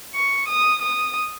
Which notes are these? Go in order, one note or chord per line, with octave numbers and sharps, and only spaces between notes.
C#6
D#6
D#6